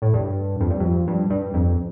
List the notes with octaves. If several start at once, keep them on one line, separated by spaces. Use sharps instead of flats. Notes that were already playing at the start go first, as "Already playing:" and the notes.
A2
G2
F2
G2
F2
G2
G2
F2